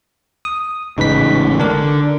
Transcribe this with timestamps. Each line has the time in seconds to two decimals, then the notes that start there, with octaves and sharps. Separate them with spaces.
0.45 D#6
0.98 A1 G#2 C#3 D#4 B4 B6
1.60 D3 D4 A#4